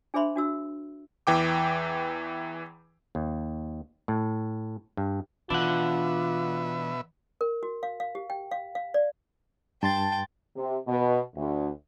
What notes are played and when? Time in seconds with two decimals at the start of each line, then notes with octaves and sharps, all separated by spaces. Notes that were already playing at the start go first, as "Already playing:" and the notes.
0.14 D4 G#4 C5 E5 B5 C6
0.36 D4 F#4 E6
1.27 E2 E3 G5 D6
3.15 D#2
4.08 A2
4.97 G2
5.50 B2 E3 D4 F4 B4 E5 F#5
7.41 A#4
7.63 F#4
7.83 F5
8.00 F5
8.15 G4
8.30 G5
8.51 F5
8.75 F5
8.94 D5
9.83 G2 G5 A5 C6 A6
10.56 C3
10.87 B2
11.35 D2